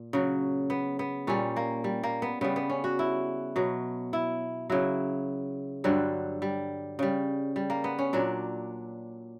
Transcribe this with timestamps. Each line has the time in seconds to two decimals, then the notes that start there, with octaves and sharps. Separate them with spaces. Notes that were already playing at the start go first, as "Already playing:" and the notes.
Already playing: A#2
0.13 C#3 F#3
0.70 B3
0.99 B3
1.27 A#2 G3 C#4
1.56 A#3
1.84 G3
2.04 A#3
2.22 B3
2.41 C#3 G3 B3
2.56 B3
2.70 C#4
2.84 F#4
2.99 E4
3.56 B2 F#3
4.13 E4
4.70 C#3 F#3 E4
5.84 G2 D3 F#3 G3
6.42 G3
6.99 C#3 G3
7.56 G3
7.70 A#3
7.84 B3
7.99 C#4
8.13 A#2 F#3 D4